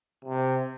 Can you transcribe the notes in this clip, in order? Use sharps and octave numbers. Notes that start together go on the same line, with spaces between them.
C3